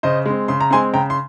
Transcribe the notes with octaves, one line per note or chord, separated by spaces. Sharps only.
C#3 C5 D#5
G#3 C4
C#3 C6
A#5
G#3 C4 G#5 C6
C#3 G5 A#5
C6